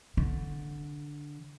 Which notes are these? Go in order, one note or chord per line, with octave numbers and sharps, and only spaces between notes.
D3